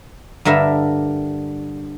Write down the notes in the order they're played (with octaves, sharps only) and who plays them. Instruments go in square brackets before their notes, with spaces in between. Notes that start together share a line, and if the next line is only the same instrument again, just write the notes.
[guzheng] G2 D3 A#4 E5